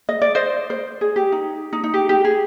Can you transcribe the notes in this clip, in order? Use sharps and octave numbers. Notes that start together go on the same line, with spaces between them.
D#5
D5
C5 D#5
C5
G#4
G4
D#4
D#4
D#4
G4
G4
G#4